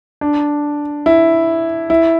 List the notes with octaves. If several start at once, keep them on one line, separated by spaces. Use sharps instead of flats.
D4
E4
E4